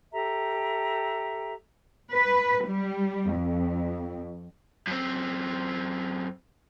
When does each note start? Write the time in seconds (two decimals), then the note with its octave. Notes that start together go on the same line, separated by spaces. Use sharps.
0.13 G4 A4 E5 A#5
2.12 B4
2.67 G3
3.32 F2
4.87 F#2 C4